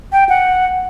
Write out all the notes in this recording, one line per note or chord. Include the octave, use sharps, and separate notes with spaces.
G5
F#5